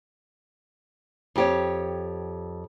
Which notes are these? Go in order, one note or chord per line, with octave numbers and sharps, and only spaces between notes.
F2 G4 C#5